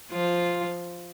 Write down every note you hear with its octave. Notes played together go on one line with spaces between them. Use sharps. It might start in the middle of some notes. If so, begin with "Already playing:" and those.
F3 F4